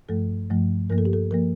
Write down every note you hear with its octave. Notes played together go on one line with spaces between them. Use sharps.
G2 F3 A3 A4
G2 F3 A3
G2 F3 A#3 A#4
A4
G4
A4
F3 A#3 A#4